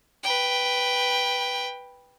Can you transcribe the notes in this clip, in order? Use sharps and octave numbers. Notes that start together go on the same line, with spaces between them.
B4 G5